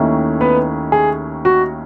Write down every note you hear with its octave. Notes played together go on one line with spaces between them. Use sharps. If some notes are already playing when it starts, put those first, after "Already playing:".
Already playing: D#2 D#3 A3 C#4 E4
B3 B4
G#4
F#4